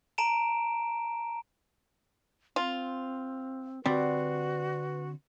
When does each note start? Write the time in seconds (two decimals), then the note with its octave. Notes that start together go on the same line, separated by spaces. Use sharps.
0.18 A5 A#5 D7 E7
2.56 C4 F4
3.86 D3 G3 C4 F#4 B4 D5